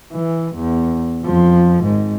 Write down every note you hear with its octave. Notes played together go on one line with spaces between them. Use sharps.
E3
E2
F2 F3
G#1 G#2